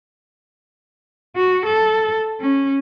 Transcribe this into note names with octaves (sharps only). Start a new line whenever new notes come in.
F#4
A4
C#4